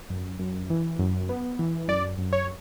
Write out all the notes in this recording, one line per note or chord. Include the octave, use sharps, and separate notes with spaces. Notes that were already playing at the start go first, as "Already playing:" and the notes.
F#2
F#2
E3
F#2
B3
E3
F#2 D5
F#2
C#5